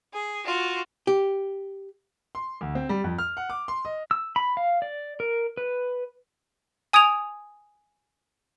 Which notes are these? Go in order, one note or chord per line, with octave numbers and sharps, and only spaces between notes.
G#4
F4 F#4
G4
C6
D2
C4
G3
F2
F6
F#5
D6
C6
D#5
E6
B5
F5
D5
A#4
B4
G#5 D#6 G#6 D7 F7